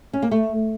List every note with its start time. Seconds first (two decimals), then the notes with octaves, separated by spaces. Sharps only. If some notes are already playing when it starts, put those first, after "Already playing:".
0.13 C#4
0.22 A#3
0.31 A3